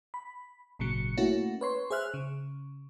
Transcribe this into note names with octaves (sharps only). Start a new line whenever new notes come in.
B5
G#1 A#2 C#3 F#3 C#7
A3 A#3 C#4 E4 F#4
B4 C#5 C6
G#4 C5 E5 F6 F#6
C#3